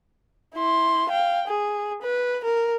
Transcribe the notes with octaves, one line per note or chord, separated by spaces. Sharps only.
E4 C6
F5 G5
G#4
B4
A#4